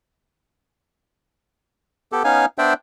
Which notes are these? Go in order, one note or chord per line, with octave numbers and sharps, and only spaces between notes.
B3 G4 A4
B3 C#4 D#4 F5 G#5
B3 D4 C5 D5 E5 G5